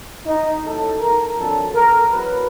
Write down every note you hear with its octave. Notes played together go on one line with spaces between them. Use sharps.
D#4
A1 A2 F#3 A4
A#4
F2 D3 F#3 A4
A#4
E2 B2 F#3 B4